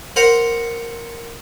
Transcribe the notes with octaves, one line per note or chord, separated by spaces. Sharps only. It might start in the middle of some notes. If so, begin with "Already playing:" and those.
A#4 C5 F#5 A#5